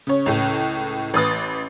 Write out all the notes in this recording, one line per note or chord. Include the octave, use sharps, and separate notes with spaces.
C#3 C#5
C#2 A2
A1 B4 D#6 A6